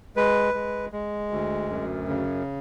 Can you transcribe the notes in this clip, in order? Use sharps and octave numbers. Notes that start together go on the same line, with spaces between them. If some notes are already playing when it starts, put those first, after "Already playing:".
G#3 B4
G#3
G#3
D2
F#2
C#3